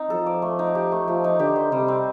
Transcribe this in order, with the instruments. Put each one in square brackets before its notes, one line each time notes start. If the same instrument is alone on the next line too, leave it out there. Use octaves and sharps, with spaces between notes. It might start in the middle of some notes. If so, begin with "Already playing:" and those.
Already playing: [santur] C4 D#4
[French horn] F3 [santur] A4
[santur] D5
A3
D#4
G4
A3
[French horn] F3 [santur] A3
[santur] D#4
[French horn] D3 [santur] G4
[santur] C5
[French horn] C3 [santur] G3
[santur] C4